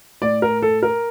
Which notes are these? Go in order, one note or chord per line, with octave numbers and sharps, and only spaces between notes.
A2 D5
A#4
A4
A#4